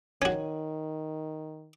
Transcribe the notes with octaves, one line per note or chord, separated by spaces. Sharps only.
D#3 C#4 F#4 C#5